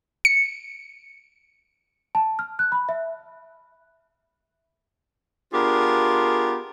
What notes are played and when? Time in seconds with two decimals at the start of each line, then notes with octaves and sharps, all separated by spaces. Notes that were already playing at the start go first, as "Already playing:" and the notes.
0.25 C#7
2.15 A5
2.39 F6
2.59 F#6
2.72 B5
2.89 E5
5.54 B3 D4 F4 G4 G#4 A#4